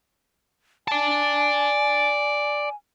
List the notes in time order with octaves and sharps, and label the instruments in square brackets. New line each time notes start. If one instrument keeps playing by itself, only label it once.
[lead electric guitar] D5 A5 [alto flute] G#5